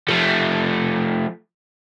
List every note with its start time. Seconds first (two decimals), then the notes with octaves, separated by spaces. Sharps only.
0.08 F3 A3